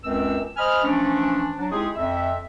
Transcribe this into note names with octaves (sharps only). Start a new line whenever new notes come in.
C#2 F#2 C4 E6
C5 D#5 G#5 B5 D#6 F6
E3 F3 A3 C#4 D4
F#3 D4
G#3 C4 D#4 E4 G4 G#4
F2 E5